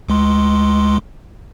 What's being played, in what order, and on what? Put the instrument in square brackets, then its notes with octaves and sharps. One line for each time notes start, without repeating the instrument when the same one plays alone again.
[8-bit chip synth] D2 G#3 C6